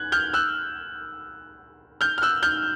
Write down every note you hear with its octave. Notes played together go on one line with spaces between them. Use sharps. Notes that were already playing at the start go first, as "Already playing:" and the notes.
Already playing: F#6 G#6
F6 G6
E6 F#6
F6 G6
F6
E6 F#6
F6 G6